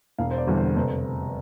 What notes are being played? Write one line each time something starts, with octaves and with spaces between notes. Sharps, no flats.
E1 F5
C5
D5
E2 D3 G3
C5
F1 C5